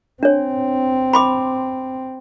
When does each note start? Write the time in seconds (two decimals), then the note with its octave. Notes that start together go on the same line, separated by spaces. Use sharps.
0.23 C4 D4 C#5
1.13 B5 C6 D6